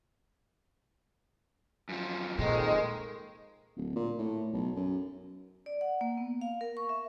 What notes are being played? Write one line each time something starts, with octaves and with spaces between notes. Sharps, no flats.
F#2 F3
F2 A#2 D#3 G#3
D1
A#2
A2
B1
F#2
D5
F#5
A#3
B3
F5
A#4
C#6
E5